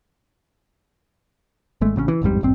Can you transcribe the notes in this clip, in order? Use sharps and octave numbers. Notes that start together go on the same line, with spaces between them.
G#1 G#3 A3
A1 C#3 B3 C#4
E3
A1 F2 G#2 G3
D#1 G#1 G2 C4